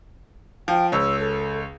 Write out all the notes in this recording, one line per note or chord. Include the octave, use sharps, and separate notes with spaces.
F3 G5
C#2 C#4 E6
A4